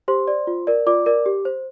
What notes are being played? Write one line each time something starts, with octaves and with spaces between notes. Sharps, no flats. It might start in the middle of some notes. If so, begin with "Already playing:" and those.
G4 C5 C6
D5
F4
A#4 D5
F4 D5 D6
A#4 D5
G4
C5